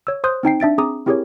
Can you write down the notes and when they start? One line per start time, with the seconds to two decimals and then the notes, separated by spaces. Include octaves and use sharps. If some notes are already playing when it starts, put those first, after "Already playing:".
0.07 C#5 E6
0.24 C5 C6 D#6 F#6 G6
0.43 C4 D#4 G5 C7
0.60 D4 E5 A6 D7
0.78 C4 G#4 A#5 D6 D#6
1.06 C4 E4 G4 G#4 A#4 C#5